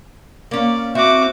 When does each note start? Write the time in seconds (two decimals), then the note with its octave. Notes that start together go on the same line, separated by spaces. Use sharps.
0.51 A#3 C#4 D5
0.95 C4 E4 F#4 E5 D6